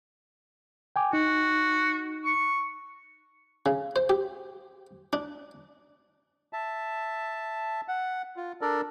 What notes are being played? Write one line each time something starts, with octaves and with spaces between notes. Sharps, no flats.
G5 G#5 D6
D#4 F#4
C#6
C#3
C5
G4
D4
E5 A5
F#5
F4
D4 A4 A#4 D5